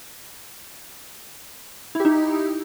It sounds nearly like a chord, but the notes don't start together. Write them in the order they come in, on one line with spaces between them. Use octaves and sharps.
E4 G4 D#4